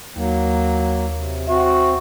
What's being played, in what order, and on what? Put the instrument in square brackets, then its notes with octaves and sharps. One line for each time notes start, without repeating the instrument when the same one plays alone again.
[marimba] D#2 [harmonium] F#3 A#3
[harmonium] C3
[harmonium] C4 [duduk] F#4 [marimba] E5